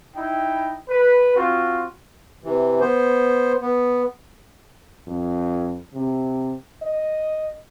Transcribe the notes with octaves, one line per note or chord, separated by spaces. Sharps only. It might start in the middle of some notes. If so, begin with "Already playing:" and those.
D#4 E4 G5
B4
C4 F4 F#4
C3 E3
B3 C5
B3
F2
C3
D#5